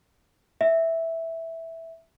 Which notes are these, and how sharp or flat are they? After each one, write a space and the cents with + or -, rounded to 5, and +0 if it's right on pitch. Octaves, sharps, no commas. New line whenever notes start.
E5 -5